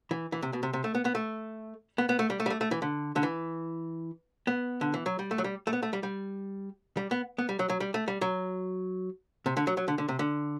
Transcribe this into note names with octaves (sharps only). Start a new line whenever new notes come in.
E3
E3
C3
B2
C3
C3
A3
B3
B3
A3
B3
B3
A3
G3
A3
G3
A3
A3
E3
D3
D3
E3
B3
D3
E3
F#3
G3
A3
F#3
G3
A3
B3
A3
G3
G3
G3
B3
B3
G3
F#3
F#3
G3
A3
G3
F#3
C3
D3
F#3
F#3
D3
D3
C3
D3